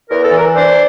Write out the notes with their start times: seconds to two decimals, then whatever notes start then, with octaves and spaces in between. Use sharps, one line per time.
0.10 E2 A#4
0.23 A4
0.32 E3
0.37 A#4
0.55 D4 C5